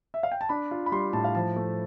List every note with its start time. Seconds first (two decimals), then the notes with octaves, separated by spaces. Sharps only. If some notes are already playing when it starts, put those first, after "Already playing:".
0.14 E5
0.23 F5
0.32 G5
0.41 A5
0.49 D4 B5
0.71 F4
0.86 B5
0.92 G3 C6
1.13 A2 A5
1.24 F5
1.35 F3 A5
1.56 A3